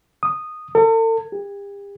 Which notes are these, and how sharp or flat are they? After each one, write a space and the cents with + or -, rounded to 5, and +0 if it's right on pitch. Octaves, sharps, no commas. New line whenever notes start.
D#6 -10
A4 +40
G4 +40